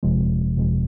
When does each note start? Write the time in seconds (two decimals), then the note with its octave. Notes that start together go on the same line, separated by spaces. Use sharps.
0.03 G1 F2 C3 F3 G#3
0.57 G1 F2 C3 F3 G#3